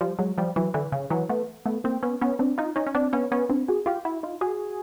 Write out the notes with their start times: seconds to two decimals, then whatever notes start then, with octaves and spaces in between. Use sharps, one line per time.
0.01 F3 G3
0.19 F#3 G#3
0.38 F3 G3
0.56 E3 F#3
0.74 D3 E3
0.92 C#3
1.10 E3 F#3
1.29 A3 B3
1.66 A3 B3
1.84 A#3 C4
2.03 B3 C#4
2.21 B3 C#4
2.39 C4 D4
2.58 D#4 F4
2.76 C#4 D#4
2.87 C#4
2.95 C4 D4
3.13 B3 C#4
3.32 B3 C#4
3.49 C4 D4
3.68 F#4 G#4
3.86 F4 G4
4.05 E4 F#4
4.23 D#4 F4
4.41 F#4 G#4